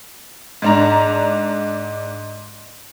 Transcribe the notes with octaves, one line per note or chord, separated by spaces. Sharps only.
G#2 D4 A#5